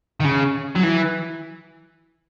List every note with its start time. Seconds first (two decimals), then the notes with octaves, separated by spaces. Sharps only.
0.20 D#3
0.25 C#3
0.75 F#3
0.83 E3